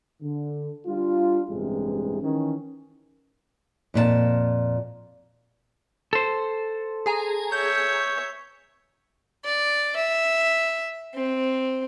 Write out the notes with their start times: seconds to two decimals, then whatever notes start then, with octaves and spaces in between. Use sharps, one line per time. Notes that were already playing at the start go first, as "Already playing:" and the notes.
0.22 D3
0.86 G3 D4 F4
1.50 A1 G2 C3 E3 G#3
2.22 D#3 E3 C#4
3.94 F2 A#2 G#4 A5
6.13 A4 C5
7.06 G#4 G#5 A#5
7.52 C#5 E5 G6
9.45 D5
9.96 E5
11.15 C4